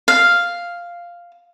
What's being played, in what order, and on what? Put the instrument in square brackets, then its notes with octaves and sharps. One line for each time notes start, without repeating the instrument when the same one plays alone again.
[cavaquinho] F5